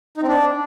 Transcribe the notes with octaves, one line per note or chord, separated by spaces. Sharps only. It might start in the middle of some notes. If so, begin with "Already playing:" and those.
D#4
C4
D4